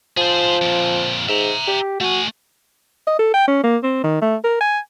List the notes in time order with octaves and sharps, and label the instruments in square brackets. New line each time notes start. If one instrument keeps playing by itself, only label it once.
[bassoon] F3 [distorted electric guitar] G#4 C5
[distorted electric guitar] F2 A#2
[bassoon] G#2 [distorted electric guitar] E5 A#5
[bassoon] G4
[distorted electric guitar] A3 G#5 [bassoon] F#4
[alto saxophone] D#5
A4
G5
C#4
A#3
C4
D#3
A3
A#4
G#5